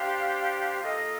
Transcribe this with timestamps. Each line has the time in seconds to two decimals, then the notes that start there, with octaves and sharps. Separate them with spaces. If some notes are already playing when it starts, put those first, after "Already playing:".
Already playing: D4 G4 C5 F5
0.80 A#3 F4 A4 D#5